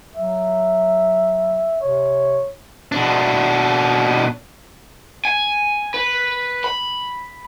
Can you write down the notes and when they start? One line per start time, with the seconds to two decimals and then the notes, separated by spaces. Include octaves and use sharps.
0.15 F#3 E5
1.81 C3 C#5
2.92 B2 D4
5.25 G#5
5.94 B4
6.64 B5